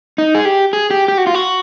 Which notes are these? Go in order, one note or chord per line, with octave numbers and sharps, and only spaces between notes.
D#4
G#4
G4
G#4
G4
G4
F#4
F4
F#4